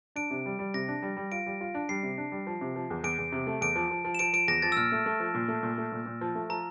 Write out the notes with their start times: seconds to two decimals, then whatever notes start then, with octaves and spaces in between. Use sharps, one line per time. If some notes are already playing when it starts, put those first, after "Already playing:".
0.16 D4 D7
0.31 C3
0.46 G3
0.59 G3
0.74 C3 A#6
0.88 D4
1.02 G3
1.17 G3
1.32 F4 D7
1.46 G3
1.61 F4
1.74 D4
1.89 G3 C7
2.03 C3
2.18 D4
2.32 G3
2.47 F3
2.61 C3
2.76 F3
2.90 E2
3.04 E2 D7
3.18 E2
3.32 C3
3.47 A3
3.61 E2 D7
3.76 F3
3.91 F3
4.05 F3
4.15 E7
4.19 F3 D7
4.33 F3 D7
4.48 E2 A#6
4.62 F3 A6
4.72 E6
4.76 A#2 F6
4.92 A3
5.06 A3
5.20 F3
5.34 A#2
5.48 A3
5.63 A#2
5.78 A3
5.92 A#2
6.06 A#2
6.21 F3
6.35 A3
6.50 F3 A#5